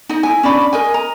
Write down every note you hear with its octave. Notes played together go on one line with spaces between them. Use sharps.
D#4 D#5
E4 G#5
C#4 D4 D5 B5
A#4 D#5 G#5
A#5